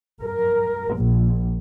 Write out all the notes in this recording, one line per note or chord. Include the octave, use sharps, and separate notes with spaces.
A#4
A#1